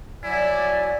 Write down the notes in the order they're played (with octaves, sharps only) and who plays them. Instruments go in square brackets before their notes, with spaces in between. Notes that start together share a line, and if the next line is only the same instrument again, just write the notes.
[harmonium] F#3 G#5 [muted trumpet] E4 [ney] D5